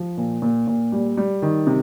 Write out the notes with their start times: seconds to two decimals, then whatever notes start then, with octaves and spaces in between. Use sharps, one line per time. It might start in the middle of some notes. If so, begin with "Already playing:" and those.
Already playing: F3
0.17 A#2
0.42 A#2
0.67 A#2
0.92 G3
1.17 G3
1.42 D#3
1.67 C3